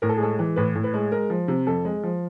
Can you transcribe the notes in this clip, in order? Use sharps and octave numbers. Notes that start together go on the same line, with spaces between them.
A2 A#4
A4
G#4
G#3 A4
E3
A2 B4
A2
B4
G#3
G#3 A#4
F3
C3
F2 A4
G#3
F3